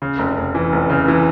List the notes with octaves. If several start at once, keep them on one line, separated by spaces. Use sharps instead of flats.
C#3
F1
F1
E3
F1
C#3
E3